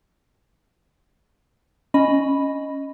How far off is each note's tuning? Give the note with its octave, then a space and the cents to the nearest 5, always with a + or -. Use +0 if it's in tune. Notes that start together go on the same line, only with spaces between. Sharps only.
C#4 +0 D#5 +0 B5 -5